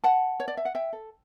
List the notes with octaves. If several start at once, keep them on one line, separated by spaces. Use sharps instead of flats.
F#5 A5
C#5
D5
E5
F#5
E5 G5
A4